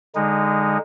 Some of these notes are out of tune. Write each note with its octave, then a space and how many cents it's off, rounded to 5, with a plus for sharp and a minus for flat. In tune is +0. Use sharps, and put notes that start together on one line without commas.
D3 +0 G#3 -20 D#4 +0